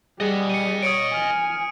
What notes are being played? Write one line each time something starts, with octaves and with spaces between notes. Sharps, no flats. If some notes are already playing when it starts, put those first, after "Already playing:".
G3 G#4 D#5 F#5
C#7 D#7
C#5 D#6 C#7 D7
G#5 F6